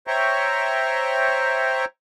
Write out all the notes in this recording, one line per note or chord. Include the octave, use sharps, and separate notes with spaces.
C5 C#5 E5 G5 A#5 C#6